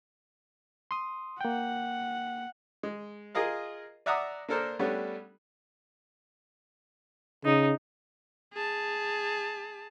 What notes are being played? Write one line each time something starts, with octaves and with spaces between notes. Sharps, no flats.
C6 D#6
A#3 F#5 G5
G#3
F4 G#4 A#4 D#5 F5
D5 E5 F#5 A#5 D6 D#6
A#3 D4 A4 A#4 C5
G3 A3 B3 C#4 D4
C#3 D#4
G#4 A5